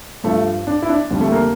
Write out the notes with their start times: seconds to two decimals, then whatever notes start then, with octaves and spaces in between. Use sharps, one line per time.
0.24 G2 F3 A3
0.67 D4
0.82 E4
0.89 D4
1.11 F2 D3 G3
1.21 A3
1.32 A#3